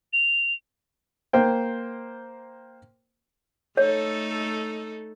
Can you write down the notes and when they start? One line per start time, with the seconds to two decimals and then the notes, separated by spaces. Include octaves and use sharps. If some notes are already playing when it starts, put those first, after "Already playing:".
0.13 F7
1.33 A#3 C5 G5
3.77 A3 D#4 A4 C#5